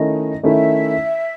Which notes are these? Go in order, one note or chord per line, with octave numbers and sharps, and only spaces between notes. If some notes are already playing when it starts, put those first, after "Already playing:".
Already playing: D#3 A3 C#4 E4 D#5
D#3 A3 C#4 E4 E5